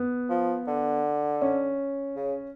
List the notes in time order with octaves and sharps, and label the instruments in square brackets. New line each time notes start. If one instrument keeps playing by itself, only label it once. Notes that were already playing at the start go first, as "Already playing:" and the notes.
Already playing: [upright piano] B3
[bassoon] F3
D3
[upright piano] C#4
[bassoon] C#3